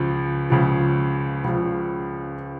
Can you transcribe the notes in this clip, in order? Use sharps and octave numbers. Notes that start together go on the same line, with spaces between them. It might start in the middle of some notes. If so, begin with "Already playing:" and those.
Already playing: C#2 C#3 F3
C#2 C#3 F3
C#2 C#3 F3